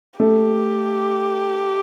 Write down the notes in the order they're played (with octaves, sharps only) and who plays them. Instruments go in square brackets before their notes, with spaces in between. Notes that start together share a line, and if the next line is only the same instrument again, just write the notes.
[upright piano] A3 [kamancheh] G4